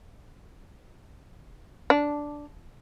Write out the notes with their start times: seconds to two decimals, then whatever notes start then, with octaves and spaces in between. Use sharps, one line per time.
1.90 D4